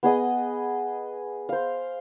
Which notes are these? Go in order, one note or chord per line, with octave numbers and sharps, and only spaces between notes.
B3 G#4 D#5
C5 F5